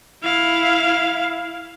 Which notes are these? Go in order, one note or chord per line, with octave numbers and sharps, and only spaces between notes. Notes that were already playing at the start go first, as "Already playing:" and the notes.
E4 F5